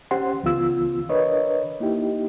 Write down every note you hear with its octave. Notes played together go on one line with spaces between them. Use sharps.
C#4 G4 C5 F#5 C6
C#2 C#3 E3 B3 F4 E6
D4 A#4 B4 C#5 D#5
A#3 D#4 E4 G4